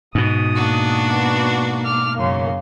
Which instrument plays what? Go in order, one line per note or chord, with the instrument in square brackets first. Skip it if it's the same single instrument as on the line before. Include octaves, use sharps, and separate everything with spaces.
[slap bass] G#2 B2 [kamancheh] D#6
[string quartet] A#3 D4 F#4
[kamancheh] B3
D6 F6
[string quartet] F#2 C#3 [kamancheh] A#3 C6